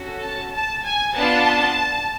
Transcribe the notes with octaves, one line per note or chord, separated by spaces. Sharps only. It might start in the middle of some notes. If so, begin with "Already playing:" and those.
Already playing: C#4 F#4 A4
A5
A5
G#5
B3 D4 F4 A5